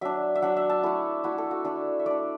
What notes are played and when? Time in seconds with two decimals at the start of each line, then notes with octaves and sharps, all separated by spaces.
0.01 F#3 D4 E5
0.35 E5
0.42 F#3 D4 F#5
0.56 E5
0.70 A5
0.83 A3 E4 A4
1.24 A3 E4 F#4
1.38 A4
1.51 F#4
1.64 A3 D4 A4
1.99 E5
2.06 A3 D4 D5